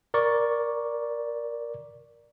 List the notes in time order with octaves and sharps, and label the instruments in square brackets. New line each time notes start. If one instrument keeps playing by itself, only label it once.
[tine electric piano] A#4 D5 C#6